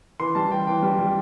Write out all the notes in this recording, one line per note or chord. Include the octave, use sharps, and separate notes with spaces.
E3 C6
G3 A5
E3 G5
E3 G5
G3
G3